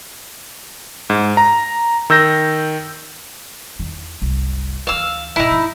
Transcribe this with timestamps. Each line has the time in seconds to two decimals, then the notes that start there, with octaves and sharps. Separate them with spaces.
1.10 G#2
1.37 A#5
2.10 D#3 E6 G6 A#6
3.79 E2 D#3
4.22 F#1 C2
4.87 D2 E3 F5 E6
5.36 G#2 B2 D#4 E4
5.51 F3